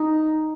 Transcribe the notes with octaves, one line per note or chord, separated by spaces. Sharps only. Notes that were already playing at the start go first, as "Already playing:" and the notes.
Already playing: D#4